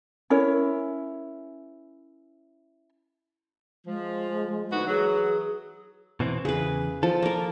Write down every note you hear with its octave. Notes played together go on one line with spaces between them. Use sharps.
C#4 E4 A#4 C#5
F3 G#3
D2 B3 D#4 F#4
E3 F#3 G#4
B2 E3 C4
E2 C#3 G#4 B4
F3 A4
A#3 A#4